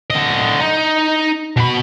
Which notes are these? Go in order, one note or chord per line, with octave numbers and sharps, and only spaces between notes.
D3 D#5
D#4
B2 B5